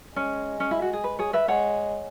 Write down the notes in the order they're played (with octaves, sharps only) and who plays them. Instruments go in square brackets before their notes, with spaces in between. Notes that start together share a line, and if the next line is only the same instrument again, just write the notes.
[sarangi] G#3 [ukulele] C#4
[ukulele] C#4
E4
F#4
G#4
B4
G#4 C#5
B4 E5
[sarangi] G#3 [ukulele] C#5 F#5